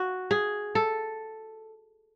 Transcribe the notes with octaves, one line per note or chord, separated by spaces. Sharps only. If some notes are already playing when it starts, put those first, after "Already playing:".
Already playing: F#4
G#4
A4